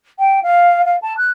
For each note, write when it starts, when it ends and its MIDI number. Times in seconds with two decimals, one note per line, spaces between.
0.19 0.40 79
0.43 0.81 77
0.85 0.96 77
1.02 1.13 81
1.17 1.31 90